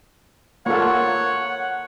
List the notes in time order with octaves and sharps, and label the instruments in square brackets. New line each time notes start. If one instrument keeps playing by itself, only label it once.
[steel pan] A#3 F4 A4 [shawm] C#5 [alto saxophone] F#5